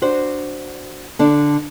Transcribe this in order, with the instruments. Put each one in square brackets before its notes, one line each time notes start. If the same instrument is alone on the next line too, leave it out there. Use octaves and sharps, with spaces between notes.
[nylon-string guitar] D4 F#4 C5
D3 D4